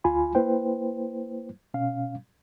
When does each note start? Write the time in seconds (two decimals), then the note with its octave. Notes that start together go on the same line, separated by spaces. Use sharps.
0.04 D2 F4 G#5 B5
0.35 A#3 E4 B4 C5 G5
1.74 B2 C#4 F5